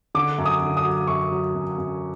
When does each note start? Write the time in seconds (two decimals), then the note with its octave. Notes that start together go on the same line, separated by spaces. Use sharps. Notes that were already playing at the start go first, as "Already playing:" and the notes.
0.15 D3 D6
0.38 F#2
0.45 D#6
0.62 D3
0.77 D#6
0.85 F#3
1.07 F#2 C#6
1.31 F#3
1.55 F#2
1.78 F#2